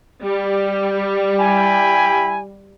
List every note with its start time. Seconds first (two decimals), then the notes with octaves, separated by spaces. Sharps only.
0.23 G3
1.39 E4 G5 G#5 B5